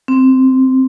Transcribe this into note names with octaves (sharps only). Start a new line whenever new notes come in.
C4